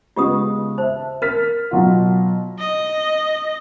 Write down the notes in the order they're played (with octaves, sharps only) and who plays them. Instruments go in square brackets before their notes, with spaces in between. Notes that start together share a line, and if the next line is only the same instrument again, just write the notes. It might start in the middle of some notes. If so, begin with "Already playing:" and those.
[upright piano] C#3 G#3 B3 [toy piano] F4 G4 D#6
[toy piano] C5 [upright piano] E5 A5
[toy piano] A#4 [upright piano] F6 A6 B6
[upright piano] B2 F#3 F4
[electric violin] D#5